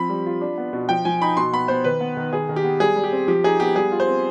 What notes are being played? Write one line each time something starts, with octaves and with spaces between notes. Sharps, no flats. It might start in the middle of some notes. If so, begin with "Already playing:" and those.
Already playing: F3 C4 B5
G3
F4
D4
B3
B2
F3 G5
F3 G#5
D#4 B5
B2 C6
B3 B5
B3 C5
D#3 B4
B3
D#3
D#3 G#4
D#3
G4
B3
G3 G#4
G3
G4
C4
F3 G4
D#4 G#4
B3 G4
G3 G#4
F4
C5
C4